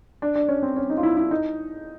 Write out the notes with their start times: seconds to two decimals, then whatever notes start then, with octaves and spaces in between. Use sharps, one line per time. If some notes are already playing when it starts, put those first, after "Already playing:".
0.22 D4
0.35 D4
0.49 C#4
0.63 C4
0.76 C#4
0.90 D#4
0.97 F4
1.03 E4
1.17 E4
1.31 D#4